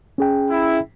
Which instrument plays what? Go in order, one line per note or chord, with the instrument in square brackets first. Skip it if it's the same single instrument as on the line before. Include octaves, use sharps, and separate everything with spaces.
[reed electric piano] C#4 G#4 G5
[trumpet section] E4